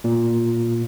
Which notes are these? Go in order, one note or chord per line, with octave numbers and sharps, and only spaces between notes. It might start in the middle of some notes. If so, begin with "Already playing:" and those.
A#2